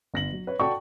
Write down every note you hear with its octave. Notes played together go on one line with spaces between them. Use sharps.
G1 A#6 F#7
F#3
B4 C#5
F#4 A4 D5 G5 A5 C#6